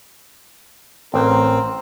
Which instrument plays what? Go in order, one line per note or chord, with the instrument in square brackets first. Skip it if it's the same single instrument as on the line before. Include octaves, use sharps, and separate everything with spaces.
[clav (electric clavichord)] A1 [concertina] C4 [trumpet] A#4